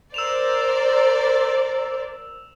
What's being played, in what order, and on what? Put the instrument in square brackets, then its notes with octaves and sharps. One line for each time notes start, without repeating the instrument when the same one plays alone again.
[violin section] A#4 C5 D5 [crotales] E6 E7 F7